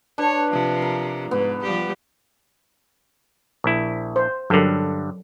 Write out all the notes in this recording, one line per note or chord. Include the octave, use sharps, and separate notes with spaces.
D4 B4 C#5
C3 F3
A#4
G#2 B3
F3 G3 G4
A#1 E4
C5
G2 D3 F#3 A4 A#4